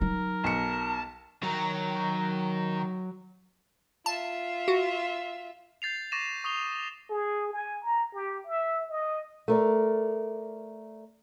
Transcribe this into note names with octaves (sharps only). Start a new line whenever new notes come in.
F#3 D#4 A#4
B1 A5 C#7
D#3 F#3 A#4
F4 E5 A5
F#4
G6 A6 C7 F7
C#6 D6 A6 A#6 D#7 E7
C#6 D#6 C7 F7 G7
G#4
G#5
A#5
G4
E5
D#5
A3 A#4 D5